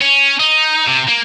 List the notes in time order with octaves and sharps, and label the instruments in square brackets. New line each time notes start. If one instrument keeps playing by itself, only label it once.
[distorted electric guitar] C#4
D#4
C3
A#3